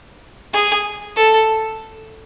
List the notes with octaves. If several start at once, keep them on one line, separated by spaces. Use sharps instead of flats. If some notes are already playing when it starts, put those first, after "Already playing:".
G#4
A4